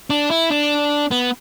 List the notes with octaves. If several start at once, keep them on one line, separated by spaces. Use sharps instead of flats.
D4
E4
D4
B3